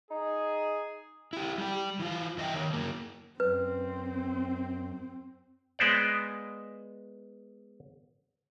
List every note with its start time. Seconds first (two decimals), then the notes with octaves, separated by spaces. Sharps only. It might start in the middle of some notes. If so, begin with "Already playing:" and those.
0.11 D#4 G#4
1.33 E4 G4
1.58 G3 G4
1.99 E3 F4
2.37 E2 D#5 E5 G5
2.53 D#3 C#5
2.73 F#2 A#3
3.40 F#2 C4 B4
5.79 G#3 B3 C5 D5